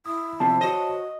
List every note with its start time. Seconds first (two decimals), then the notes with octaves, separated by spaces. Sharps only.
0.06 E4 D#6
0.40 E2 C3 F3 A5
0.61 F#4 C5 C#5 D#5